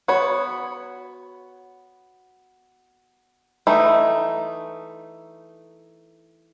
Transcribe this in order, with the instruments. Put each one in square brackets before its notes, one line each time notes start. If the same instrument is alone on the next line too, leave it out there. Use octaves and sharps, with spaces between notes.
[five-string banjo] B3 F#4 C#5
E3 A3 D#4